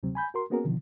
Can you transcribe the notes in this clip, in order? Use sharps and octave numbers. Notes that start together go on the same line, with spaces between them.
D2 C3 F#3 C4
G#5 B5 G6
F#4 A#4 C6
A#3 B3 C#4 F#4 G#4 A#4
B2 D3 D#3 F3